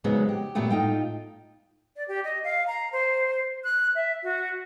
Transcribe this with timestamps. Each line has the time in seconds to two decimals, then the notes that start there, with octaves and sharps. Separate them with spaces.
0.04 F2 C#3 F#3 G#3 B3 D#4
0.29 G4
0.55 F#2 A#2 F#3 G3 A3 B3
0.71 A2 D#4 F4 G5
1.96 D5
2.08 G4
2.24 D#5
2.44 F5
2.67 A#5
2.92 C5
3.64 F#6
3.95 E5
4.23 F#4